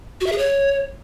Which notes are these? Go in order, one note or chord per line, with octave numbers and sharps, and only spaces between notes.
F#4
E5
G#4
C#5